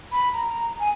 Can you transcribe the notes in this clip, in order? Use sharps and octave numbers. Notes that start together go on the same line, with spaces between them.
B5
A#5
A#5
G#5